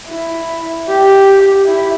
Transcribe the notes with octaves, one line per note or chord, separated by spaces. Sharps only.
E4
G4
E4